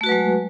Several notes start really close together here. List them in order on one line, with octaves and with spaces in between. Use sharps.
A3 F#4 B4 F#3 G#3